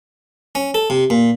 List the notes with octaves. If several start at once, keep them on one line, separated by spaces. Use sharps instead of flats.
C#4
A4
C3
A#2